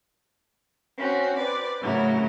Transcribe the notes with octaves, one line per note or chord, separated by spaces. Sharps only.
C4 C#4 F#4
B4 C5 D5
A2 C#3 F#3 E4 A#4